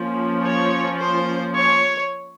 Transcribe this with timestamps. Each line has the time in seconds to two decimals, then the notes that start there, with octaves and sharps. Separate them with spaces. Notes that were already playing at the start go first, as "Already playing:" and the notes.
Already playing: F3 A#3 C#4
0.42 C#5
1.00 C5
1.59 C#5